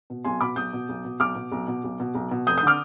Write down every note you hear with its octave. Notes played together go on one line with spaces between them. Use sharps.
B2
B1 G#5 C6
B2 B5 D6
B1 D#6 G6
B2
B1
B2
B1 D6 F6
B2
B1
B2
B1
B2
B1
B2
F1 D#6 G6
D#6 G6
D3 D6 F6